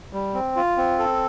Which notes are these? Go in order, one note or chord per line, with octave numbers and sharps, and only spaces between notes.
G3
C4
F4
C4
A4